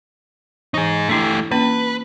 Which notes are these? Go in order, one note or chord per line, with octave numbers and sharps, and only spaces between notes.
E3 D#4 G#4
A3 D4 E4 G4
A#3 C#4 B4